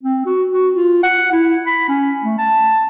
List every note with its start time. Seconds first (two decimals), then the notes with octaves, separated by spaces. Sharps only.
0.03 C4
0.26 F#4
0.52 F#4
0.75 F4
1.03 F#5
1.32 E4
1.66 B5
1.89 C#4
2.24 A3
2.38 A5